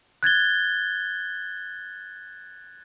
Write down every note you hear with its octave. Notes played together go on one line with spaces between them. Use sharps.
F#6 G#6 A6 G7